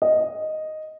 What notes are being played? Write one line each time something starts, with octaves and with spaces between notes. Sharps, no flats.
D#5